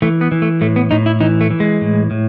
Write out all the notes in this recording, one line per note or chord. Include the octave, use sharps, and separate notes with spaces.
E3 A3
B3
E3
A3
A2 A3
B3
A2 D#4
E4
E3 D#4
A3
E3
G#3
A2
A2